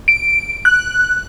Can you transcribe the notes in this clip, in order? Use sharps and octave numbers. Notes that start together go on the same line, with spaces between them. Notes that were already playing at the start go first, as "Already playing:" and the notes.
D7
F#6